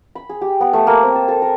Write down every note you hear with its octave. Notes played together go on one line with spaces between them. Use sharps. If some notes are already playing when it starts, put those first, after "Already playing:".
B5
G#4
G4
B3
A3
A#3
C4
A5
A4
A#4